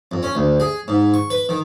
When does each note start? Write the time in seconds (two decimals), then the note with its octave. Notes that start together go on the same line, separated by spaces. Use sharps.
0.11 F2
0.23 C#4
0.35 D2
0.60 G#4
0.88 G#2
1.14 C#6
1.30 B4
1.49 D#3